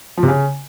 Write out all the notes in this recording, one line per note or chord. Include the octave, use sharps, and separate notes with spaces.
F3
C3
C#3